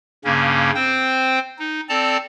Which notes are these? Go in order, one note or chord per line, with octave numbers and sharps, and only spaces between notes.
G2 C#3 A#3 C#4
C4 C5 G5
D#4
C4 A4 D5 A5 A#5